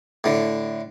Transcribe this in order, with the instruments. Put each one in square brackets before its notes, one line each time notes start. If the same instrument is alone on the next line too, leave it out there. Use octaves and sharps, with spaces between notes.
[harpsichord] A2 D3